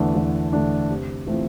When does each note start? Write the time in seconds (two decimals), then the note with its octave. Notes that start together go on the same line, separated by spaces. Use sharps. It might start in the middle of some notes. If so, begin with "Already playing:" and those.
Already playing: E2 D3 A3 D4
0.15 E2
0.53 D3 A3 D4
0.89 C3
1.27 E3 A3 C4 F4